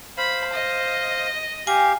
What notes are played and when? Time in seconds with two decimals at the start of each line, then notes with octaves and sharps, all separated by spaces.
0.18 C5 F5 B5
0.53 D#5
1.67 G4 F5 G#5